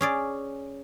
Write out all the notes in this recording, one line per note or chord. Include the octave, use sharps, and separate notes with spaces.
C#4 G#4 D5